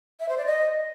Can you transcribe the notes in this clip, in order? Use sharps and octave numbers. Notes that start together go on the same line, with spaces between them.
E5
C5
D5
D#5